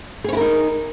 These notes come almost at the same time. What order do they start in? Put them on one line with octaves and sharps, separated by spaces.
G#4 C#5 E4 A#4 D#4